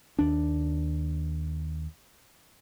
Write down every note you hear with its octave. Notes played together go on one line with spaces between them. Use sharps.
D#2 D4